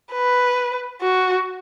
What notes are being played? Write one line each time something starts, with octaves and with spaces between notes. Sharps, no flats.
B4
F#4